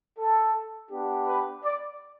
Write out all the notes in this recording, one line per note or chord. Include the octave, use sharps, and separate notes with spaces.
A4
B3 D4 G4
B4
D5